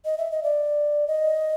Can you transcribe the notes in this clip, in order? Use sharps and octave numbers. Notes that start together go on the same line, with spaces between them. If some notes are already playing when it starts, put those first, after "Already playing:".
D#5
E5
D#5
D5
D#5